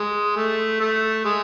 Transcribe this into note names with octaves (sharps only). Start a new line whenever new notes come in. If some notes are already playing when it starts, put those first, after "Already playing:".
Already playing: G#3
A3
A3
G#3